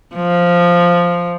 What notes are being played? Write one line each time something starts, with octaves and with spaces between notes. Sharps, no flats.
F3